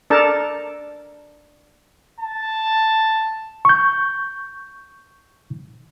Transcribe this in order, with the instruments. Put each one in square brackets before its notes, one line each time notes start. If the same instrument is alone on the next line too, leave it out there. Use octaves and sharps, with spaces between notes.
[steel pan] D4 A4 A#4 A5
[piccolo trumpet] A5
[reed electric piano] C#6 G6